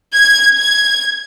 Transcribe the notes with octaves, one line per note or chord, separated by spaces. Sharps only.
G#6
G#6